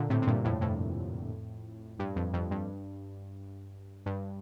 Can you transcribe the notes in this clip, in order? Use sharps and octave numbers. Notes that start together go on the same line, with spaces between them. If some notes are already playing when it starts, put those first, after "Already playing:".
Already playing: A#2 D3
A2 C3
C3
G2 A#2
F2 A2
F2 A2
G2
F2
F2
G2
G2